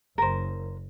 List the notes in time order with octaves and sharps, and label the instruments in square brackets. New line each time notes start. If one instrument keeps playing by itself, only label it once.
[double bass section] F#1 [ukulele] A#4 C5